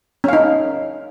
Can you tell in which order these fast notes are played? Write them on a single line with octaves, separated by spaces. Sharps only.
C#4 F5 D#4